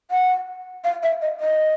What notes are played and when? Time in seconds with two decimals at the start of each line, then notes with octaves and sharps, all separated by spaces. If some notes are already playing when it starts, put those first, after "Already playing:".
0.11 F#5
0.84 F5
1.03 E5
1.22 D#5
1.40 D#5